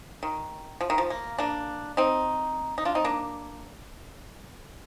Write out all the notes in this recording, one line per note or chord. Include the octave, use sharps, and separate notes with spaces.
D#3
F3
D#3
F3
A#3
A#3 D4
C4 D#4
D#4
D4 F4
C4 D#4
A#3 D4